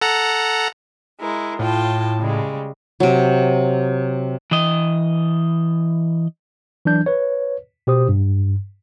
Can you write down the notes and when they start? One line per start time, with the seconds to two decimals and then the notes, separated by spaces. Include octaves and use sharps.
0.01 A4 F#5 A#5
1.19 G#3 E4 A#4
1.59 A2 F4 G5 A5
2.18 C#3 G3 G#3
3.00 C3 F#3
4.51 E3 D#5
6.85 E3 F#3 D4 G6
7.06 B4 C#5
7.87 B2 G4 C5 D#6
8.08 G2